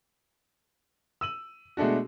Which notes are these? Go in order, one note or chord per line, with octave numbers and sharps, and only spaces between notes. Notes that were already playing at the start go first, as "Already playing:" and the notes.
E6 D#7 F#7
B2 G#3 A3 D4 F#4